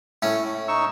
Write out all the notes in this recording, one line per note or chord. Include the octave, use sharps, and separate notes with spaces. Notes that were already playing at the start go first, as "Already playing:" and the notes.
A2 C#4
D#4 C#6 E6